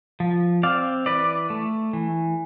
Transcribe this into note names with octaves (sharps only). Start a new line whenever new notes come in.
F3
C4 D5 F5
E3 B4 D5
A3
E3